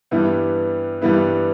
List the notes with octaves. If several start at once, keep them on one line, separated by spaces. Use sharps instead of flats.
G2 E3 G3 B3 E4
G2 E3 G3 B3 E4